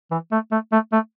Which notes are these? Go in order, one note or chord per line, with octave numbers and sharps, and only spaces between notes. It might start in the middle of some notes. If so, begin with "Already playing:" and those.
E3
A3
A3
A3
A3